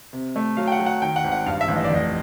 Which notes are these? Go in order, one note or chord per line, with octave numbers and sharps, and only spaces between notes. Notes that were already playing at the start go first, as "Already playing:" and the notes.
C3
A3
F#3 F5
G5
F#5
F#3
F#5
D#3 G5
F#5
G#1
F#5
G2 F5
E5
A1
D#5
D5
F1 D#5